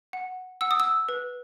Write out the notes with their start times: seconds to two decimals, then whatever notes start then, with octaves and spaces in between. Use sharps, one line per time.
0.13 F#5
0.61 F#5 E6
0.71 D#6
0.80 E6
1.09 B4